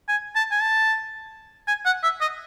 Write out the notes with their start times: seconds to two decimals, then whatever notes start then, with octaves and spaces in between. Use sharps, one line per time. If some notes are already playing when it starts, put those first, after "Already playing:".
0.08 G#5
0.35 A5
0.51 G#5
0.62 A5
1.68 G#5
1.86 F#5
2.03 E5
2.21 D#5